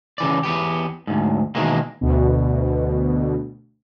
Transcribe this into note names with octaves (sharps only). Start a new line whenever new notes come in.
C#3 E3 D5
E2 B3 G4
D2 G#2
B2 D#3 E3 G#3 A#3
D2 B2